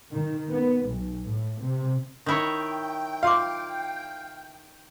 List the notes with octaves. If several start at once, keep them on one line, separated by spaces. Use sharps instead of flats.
D#3
B3
B1
A2
C3
D#3 E4 C#5 G5
F4 F5 C6 D6